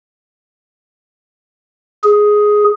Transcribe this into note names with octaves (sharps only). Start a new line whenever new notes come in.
G#4